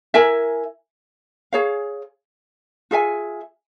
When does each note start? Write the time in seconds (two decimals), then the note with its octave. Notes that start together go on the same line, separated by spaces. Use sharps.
0.14 E4 A#4 E5 G#5
1.53 G#4 C#5 F5
2.91 F4 G#4 E5 G#5